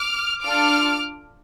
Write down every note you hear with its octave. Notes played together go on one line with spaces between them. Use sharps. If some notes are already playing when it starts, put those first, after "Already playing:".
Already playing: D6 F6
D4 F4 A4 D6 F6